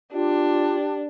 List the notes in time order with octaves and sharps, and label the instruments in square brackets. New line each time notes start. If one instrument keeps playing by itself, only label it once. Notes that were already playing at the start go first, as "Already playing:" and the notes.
[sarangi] D4 [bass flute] F4 [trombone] G4